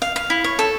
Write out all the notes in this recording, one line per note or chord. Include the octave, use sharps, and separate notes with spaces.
F5
F5
E4
C#5
A4